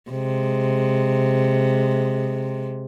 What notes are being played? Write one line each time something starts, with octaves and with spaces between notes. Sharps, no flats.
C3 G#3